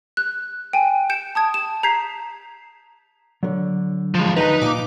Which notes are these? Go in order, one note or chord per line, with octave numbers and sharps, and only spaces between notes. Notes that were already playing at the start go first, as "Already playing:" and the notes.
F#6
G5 G#5
G6 C#7 D7 E7
A5 D#6 G#6
E7
A#5 G6 G#6 B6 C7
D3 F#3
F3 G#3
D2 D#4 B4 A#5
A#2 D6